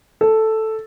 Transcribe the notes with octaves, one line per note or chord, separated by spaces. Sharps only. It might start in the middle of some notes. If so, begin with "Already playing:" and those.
A4